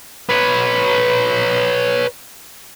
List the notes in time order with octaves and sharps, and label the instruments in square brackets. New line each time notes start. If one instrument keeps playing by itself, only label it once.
[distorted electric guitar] B4 C#5